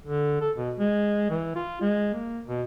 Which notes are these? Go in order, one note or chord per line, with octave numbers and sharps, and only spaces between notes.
D3
A4
B2
G#3
E3
F4
G#3
A#3
B2